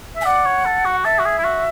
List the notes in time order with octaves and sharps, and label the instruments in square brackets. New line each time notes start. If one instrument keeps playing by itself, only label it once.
[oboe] E5
[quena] G#5
[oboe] D5 [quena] F#5
[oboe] C#5
A4
F#4
[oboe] A4 [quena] E5
[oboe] F#4
G#4
E4
F#4